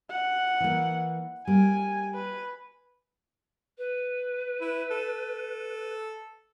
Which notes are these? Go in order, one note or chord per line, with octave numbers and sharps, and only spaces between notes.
F#5
E3 A#3
G3 A#3 G#5
B4
B4
E4
A4